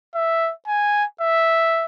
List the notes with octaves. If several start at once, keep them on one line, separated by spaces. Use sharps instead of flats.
E5
G#5
E5